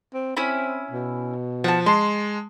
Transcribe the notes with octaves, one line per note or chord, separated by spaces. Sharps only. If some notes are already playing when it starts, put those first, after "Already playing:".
C4
C4 C#4 E4 B5
B2
F3 F#5 A5
G#3 A5 C6